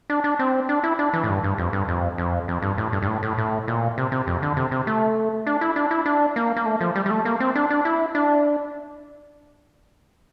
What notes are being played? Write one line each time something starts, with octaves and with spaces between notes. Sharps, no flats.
D4
D4
C4
D4
E4
D4
E3
A2
G2
G2
F2
G2
F2
F2
F2
G2
A2
G2
G2
A2
A2
A2
A#2
C3
C3
F2
D3
C3
C3
A3
D4
E4
D4
E4
D4
A#3
A#3
A3
F3
G3
G3
A3
A#3
C4
D4
D4
E4
D4